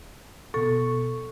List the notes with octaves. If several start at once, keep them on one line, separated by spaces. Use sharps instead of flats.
B2 A4 C#6